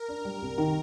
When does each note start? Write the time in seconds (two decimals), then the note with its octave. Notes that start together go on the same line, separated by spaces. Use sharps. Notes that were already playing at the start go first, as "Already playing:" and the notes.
Already playing: A#4
0.08 D4
0.25 G3
0.42 C2
0.58 D#3